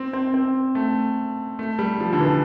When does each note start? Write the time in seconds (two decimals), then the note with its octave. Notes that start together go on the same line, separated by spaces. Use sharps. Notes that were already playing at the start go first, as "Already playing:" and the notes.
Already playing: C4
0.13 C4
0.34 C4
0.75 A3
1.59 A3
1.79 G3
2.00 F3
2.13 D3
2.20 E3